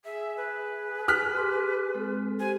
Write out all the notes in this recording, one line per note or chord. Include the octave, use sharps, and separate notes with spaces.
G#4 E5
B4
F6 F#6 B6
G4 C6 D6
G#3 C4 A4
G4 C5 G#5